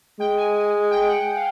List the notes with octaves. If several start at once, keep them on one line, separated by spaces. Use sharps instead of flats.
G#3 G5
G#5
G#5
G5
F#5
F#5
F5